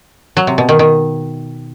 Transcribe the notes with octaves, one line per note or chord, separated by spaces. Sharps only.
F#3
C3
B2
D#3
D#3